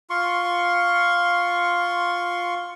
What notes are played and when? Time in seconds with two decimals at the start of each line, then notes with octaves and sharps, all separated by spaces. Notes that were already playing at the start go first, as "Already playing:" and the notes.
0.10 F4 C6 C#6